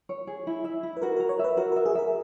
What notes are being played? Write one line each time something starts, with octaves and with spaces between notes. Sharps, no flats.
C#5
G#4
E4
E5
E4
B4
F#4 A#4
A#4
A#5
C#5
E5
B4
F#4 A#4
A#4
E5
G#4
A#4 E5